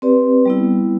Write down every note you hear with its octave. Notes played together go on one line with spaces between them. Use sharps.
C4 G4 B4 D5
G3 B3 E4